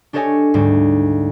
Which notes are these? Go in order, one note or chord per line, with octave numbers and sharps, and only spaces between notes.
D4 G4 A4 C#5 D#5 G#5
D2 G#2 G3